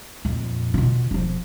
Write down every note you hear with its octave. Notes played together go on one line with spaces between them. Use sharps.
F2 A#2
B2 F4
E1 F3